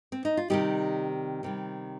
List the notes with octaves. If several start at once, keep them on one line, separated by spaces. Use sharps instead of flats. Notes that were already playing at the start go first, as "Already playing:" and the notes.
C4
D#4
F4
C3 D#3 G3 D#4 G4
C3 D#3 G3